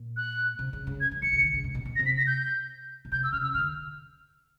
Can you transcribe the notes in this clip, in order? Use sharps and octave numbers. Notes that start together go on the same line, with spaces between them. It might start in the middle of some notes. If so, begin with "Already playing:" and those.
Already playing: A#2
F#6
C3
C#3
C#3
G#6
E3
D#3 C#7
C#3
D#3
C#3
C3
B2
B2
A#6
C3
B6
A#6
G6
B2
C3 G6
E6
C#3 F6
E6
D3 F6